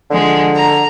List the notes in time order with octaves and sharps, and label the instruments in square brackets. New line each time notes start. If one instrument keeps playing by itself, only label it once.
[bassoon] D3 [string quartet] F3 G#3
[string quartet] A#5